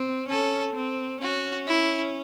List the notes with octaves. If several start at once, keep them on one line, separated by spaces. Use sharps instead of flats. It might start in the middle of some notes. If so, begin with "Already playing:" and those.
Already playing: C4
C#4 A4
C4
C#4 F#4
E4